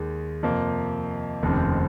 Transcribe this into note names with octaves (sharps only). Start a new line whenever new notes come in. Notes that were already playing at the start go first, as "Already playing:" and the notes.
Already playing: D#2 D#3 G#3
F2 C3 F3 A#3
F1 D#2 C#3 F3 C4